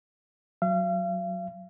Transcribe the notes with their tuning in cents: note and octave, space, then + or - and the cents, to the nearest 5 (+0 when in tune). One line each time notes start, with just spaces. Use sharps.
F#3 +0 F5 -40